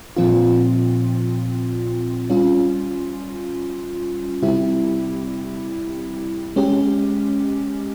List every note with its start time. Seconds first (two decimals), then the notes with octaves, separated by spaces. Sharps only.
0.17 A#2 F3 C4 F4
2.30 G3 C#4 F4
4.42 C3 G3 C4 E4 G4
6.56 G#3 C#4 G4